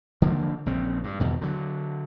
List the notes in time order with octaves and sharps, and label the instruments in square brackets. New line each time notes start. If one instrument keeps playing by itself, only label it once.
[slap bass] D3 F3 A#3
A#1 C#3 C4
G2
E2 B2 D#3
D3 F#3